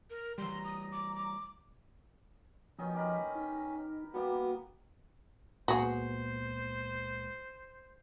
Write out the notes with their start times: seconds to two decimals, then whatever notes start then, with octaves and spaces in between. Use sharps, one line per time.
0.10 A#4
0.38 E3 G3 A#5 C6
0.64 D#6
0.92 D6
1.15 D6
2.79 B2 D#3 F3 C#4 D#4
2.94 G4 A#4 B5
3.35 D#4
4.14 G3 A#3 B3 F#4 G4
5.68 C#2 A#2 B3 F#4 G#4 C5